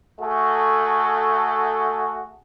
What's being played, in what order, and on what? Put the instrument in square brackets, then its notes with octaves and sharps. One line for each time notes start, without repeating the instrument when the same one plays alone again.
[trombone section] A3 F#4 G#4 A4